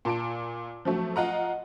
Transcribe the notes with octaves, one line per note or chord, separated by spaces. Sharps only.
A#2 A5 D7
F3 F#3 A3 C4
F4 D#5 F#5 A#5